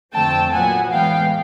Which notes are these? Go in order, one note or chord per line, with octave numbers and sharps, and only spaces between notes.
F2 D3 F3 A3 C4 G5 A5
A#2 F#3 B3 F#5 G#5
A2 E3 G#3 B3 F5 G5